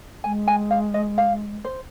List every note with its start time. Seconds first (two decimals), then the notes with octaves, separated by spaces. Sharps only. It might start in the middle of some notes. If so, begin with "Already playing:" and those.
0.24 G#3 G#5
0.48 G#5
0.71 F5
0.94 D#5
1.18 F5
1.65 C5